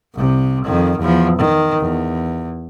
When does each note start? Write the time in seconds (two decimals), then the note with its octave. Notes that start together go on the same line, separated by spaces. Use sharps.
0.14 C2 C3
0.64 F2 D#3
0.98 E2 F3
1.37 D#3
1.78 E2